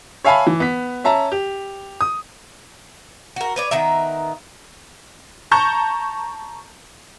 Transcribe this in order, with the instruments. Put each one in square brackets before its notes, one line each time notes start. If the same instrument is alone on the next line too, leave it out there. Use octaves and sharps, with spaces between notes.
[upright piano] C#5 E5 F5 G#5 A5 B5
E3
B3 B6
C#4 E5 A5 A#5
G4
D#6
[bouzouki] F#4 A#4
B4 C#5 D5
D#3 B3 A#4 E5
[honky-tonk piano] A5 A#5 C#6 G6